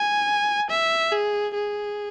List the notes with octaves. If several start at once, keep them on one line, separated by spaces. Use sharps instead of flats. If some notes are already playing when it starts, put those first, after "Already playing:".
Already playing: G#5
E5
G#4
G#4